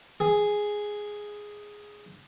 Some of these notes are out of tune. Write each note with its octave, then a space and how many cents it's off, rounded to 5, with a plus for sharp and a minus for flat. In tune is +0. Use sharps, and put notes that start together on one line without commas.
G#4 +0